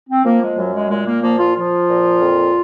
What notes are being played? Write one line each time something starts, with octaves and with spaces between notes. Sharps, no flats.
C4
F3 A#3
G#3
F#2 F#3
G#3
A#2 G#3
A#3
F3 A#3
F4
F3 F4
A#2
F2